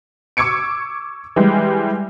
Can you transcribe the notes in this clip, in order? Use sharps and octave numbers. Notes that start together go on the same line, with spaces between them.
C#6 D6 E6 G#6 C#7 D7
E3 G3 G#3